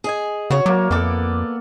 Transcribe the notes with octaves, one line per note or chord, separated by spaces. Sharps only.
G#4 D#5 G#5
C#3 F#4 C#5
F#3 A#3 D5
F2 A#3 B3 A4 D5 F#5